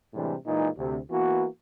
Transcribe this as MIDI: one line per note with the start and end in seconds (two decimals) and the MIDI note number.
0.14 0.34 45
0.14 0.34 48
0.14 0.34 52
0.14 0.34 55
0.14 0.34 56
0.14 0.34 62
0.46 0.68 46
0.46 0.68 52
0.46 0.68 56
0.46 0.68 63
0.77 0.97 38
0.77 0.97 48
1.10 1.45 52
1.10 1.45 58
1.10 1.45 59
1.10 1.45 66